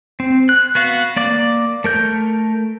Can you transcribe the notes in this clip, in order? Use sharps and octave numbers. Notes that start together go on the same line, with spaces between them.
C4
F#6
B3 F#4 F5
A#3 D5 D6
A3 A#4 G6